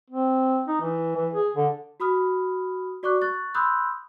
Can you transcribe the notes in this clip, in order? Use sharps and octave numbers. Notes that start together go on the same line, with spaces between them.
C4
D#4
E3
E3
G#4
D3
F#4 B5 D#6 F6
F#4 D5 C#6 D6 F#6
C#6 F#6 A6
B5 C6 D#6 E6 F#6 G6